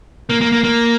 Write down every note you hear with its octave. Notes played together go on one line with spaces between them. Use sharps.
A#3
A#3
A#3
A#3